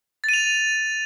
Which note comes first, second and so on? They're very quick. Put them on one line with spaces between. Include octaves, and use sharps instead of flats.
A6 D#7 F7